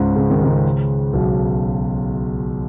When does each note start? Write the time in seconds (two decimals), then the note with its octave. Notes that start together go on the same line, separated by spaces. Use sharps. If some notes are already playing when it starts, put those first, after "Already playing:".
Already playing: C#2 G#2 C#3
0.16 C#3
0.30 D#3
0.43 C#2 C#3
1.13 B1 B2